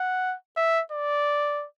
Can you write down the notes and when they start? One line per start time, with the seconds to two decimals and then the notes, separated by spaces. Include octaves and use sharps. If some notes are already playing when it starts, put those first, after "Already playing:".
Already playing: F#5
0.57 E5
0.92 D5